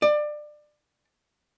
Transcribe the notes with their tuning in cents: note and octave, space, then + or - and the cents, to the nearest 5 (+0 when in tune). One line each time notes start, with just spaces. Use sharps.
D5 +25